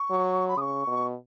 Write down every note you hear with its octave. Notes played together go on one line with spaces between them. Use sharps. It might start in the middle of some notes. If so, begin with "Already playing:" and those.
Already playing: C#6
F#3
B5
C#3 C#6 D#6
B2